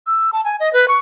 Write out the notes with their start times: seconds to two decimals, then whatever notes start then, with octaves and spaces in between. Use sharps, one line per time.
0.07 E6
0.33 A5
0.45 G#5
0.60 D#5
0.73 B4
0.88 C#6